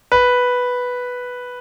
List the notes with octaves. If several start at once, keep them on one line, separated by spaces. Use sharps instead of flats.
B4